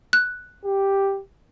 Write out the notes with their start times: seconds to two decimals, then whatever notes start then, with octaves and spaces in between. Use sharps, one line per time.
0.13 F#6
0.65 G4